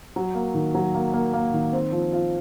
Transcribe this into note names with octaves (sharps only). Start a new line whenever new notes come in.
F#3
A#3
D#3
F#3
A#3
A#3
A#3
D#3
C4
F3
F4